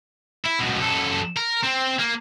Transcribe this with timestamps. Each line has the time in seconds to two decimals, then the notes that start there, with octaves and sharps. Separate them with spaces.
0.46 E4
0.60 C#2 B2
0.80 F#2 A4
1.37 A#4
1.64 C4
1.99 A#3